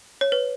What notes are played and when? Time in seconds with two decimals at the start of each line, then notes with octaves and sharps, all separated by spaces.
0.21 C#5
0.32 B4